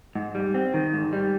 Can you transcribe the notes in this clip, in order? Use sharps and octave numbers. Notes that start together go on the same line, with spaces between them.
G#2
G3
C4
D#3
G#2
G3